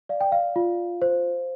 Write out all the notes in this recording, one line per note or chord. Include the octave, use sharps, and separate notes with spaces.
D5 F5
G5
F5
F4
C5